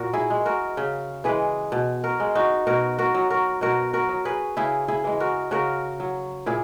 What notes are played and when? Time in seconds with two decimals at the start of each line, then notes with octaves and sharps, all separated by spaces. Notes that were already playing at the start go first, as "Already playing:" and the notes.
Already playing: A#2 F#4 A#4
0.13 E4 G#4
0.30 G#3
0.46 F#4 A#4
0.77 C#3
1.24 E3 G#3 G#4 B4
1.72 B2
2.04 F#4 A#4
2.20 G#3
2.35 D#4 F#4
2.67 B2 F#4 A#4
2.99 F#4 A#4
3.14 F#3
3.30 F#4 A#4
3.61 B2 F#4 A#4
3.93 F#4 A#4
4.09 F#3
4.25 G#4 B4
4.57 C#3 E4 G#4
4.88 E4 G#4
5.04 E3 G#3
5.20 F#4 A#4
5.51 C#3 F#4 A#4
6.00 F#3
6.46 A#2 E4 G#4